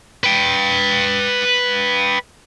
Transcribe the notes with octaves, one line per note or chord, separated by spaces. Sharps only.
B4 G5